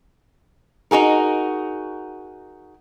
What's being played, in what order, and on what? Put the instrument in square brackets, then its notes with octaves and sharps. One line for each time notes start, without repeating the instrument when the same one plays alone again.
[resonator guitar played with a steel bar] D#4 F#4 G#4 A#4